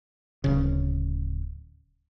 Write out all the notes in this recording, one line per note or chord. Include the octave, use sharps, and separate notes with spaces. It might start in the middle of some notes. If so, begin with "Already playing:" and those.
D1 C#3